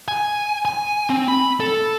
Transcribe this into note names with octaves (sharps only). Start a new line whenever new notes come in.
G#5
G#5
C4
B5
A4